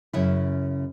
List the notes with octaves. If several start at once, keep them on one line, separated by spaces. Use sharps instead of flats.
F#2 C#3 E4